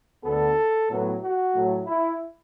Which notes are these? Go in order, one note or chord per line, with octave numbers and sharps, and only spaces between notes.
D2 D3 B3 A4
A2 F#3 B3
F#4
A2 F#3 A3
E4